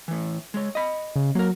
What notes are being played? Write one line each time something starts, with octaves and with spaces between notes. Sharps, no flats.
A2 E3
G#3 C#5
D#5 B5
C#3
F#3 A#3 A#4